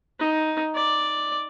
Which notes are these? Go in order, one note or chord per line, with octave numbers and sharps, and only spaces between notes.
D#4
D5